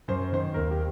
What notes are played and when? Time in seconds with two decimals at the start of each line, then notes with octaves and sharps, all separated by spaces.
0.08 F#2 C5
0.32 D#3 C5
0.54 D#2 A#4
0.71 G4